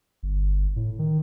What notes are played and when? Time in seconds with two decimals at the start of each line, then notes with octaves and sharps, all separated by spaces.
0.23 G1
0.76 A2
0.99 D#3